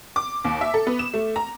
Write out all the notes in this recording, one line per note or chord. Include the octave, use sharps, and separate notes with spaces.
D6
D#2
E5
A4
B3
E7
A3
A#5